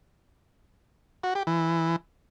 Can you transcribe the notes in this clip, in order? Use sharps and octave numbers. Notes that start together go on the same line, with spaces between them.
F#4
G4
E3